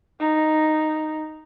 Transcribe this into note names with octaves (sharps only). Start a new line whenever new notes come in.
D#4